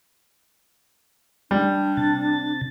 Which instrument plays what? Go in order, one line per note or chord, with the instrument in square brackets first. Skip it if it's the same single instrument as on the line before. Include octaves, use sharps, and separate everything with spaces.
[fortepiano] G3 [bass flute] D4
[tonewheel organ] C3 A6